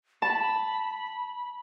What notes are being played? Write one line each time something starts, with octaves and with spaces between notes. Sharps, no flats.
A5 B5